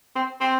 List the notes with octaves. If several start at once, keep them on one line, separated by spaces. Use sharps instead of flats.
C4
C4